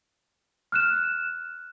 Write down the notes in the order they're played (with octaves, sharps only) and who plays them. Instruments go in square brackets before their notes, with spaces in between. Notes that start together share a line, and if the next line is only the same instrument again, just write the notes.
[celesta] F6 F#6 E7